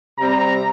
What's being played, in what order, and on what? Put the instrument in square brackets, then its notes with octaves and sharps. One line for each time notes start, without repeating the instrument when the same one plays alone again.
[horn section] C3 G3 C4 A#5